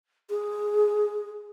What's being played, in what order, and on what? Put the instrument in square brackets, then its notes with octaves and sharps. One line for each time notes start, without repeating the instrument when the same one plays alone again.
[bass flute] G#4